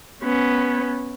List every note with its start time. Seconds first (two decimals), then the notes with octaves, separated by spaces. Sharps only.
0.23 B3 C#4